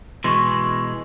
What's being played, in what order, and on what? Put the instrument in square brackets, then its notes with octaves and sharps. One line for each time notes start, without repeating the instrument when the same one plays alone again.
[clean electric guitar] B2 E3 G#3 [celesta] C6 C#6